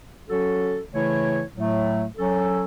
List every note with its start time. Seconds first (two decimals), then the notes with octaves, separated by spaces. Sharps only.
0.30 F#3 C#4 F#4 A4
0.92 C#3 E3 A3 E4 C#5
1.55 A2 F#3 A3
2.17 F#3 C#4 A4